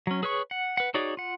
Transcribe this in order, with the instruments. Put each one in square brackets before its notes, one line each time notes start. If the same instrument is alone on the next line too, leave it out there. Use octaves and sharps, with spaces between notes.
[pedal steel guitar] F#3 C#4
G#4 B4 C#5 C#6
F#5
B4 F#5
D#4 F#4 G#4 C#5 D5
F4 F#5